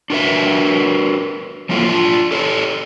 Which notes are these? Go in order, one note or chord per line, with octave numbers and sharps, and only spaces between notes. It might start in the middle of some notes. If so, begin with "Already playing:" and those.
D4 F#4 A#4 B4 E5
F3 F#3 A#3 E4 F4 A4
D4 F4
G4 A4 C#5